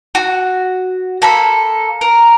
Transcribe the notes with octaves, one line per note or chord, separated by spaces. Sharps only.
F#4
A#3 A4 B5
A#4